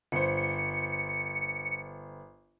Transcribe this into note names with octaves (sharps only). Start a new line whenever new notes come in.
G1 C5 C#7